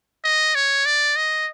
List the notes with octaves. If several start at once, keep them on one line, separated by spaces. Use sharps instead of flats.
D#5
C#5
D5
D#5